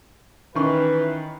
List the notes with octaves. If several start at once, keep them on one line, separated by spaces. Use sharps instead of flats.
D#3 E3 C#4 B4 C#6